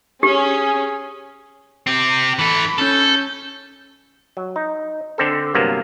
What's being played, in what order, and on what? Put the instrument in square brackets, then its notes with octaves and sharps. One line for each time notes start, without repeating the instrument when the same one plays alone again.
[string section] C#4 [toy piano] G4 [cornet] G#4
[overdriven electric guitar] C4 G4
[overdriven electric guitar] E3 A4 [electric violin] B5
[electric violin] C#4 G6 [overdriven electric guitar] A4
[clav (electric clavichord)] F#3
D#4
D3 C4 A4
G2 C3 F#3 A#3 B3